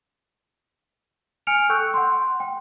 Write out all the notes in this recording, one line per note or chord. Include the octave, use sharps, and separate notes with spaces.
G#5 F6 C#7 D7 F7
A4 G5 C#6 E6 F#6 G6
F#5 C6
G5